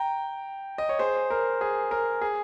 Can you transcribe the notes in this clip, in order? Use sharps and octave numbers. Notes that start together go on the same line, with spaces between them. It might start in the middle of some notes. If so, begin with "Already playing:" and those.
Already playing: G5 A#5
D#5
C#5
G#4 C5
A#4
G#4
A#4
G#4